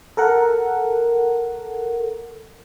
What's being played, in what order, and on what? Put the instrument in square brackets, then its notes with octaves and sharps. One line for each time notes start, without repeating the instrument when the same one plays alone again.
[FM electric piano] A4 A#4 F#5